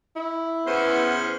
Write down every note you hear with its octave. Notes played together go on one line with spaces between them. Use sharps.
E4
E2 B3 C#4 C5